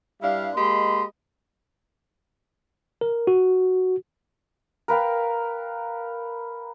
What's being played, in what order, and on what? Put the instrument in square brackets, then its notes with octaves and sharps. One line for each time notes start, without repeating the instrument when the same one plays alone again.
[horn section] G2 G3 D4 E4 F5
G#3 A#3 G4 D#5 B5 C6
[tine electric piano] A#4
F#4
[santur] A#4 B4 F5 G5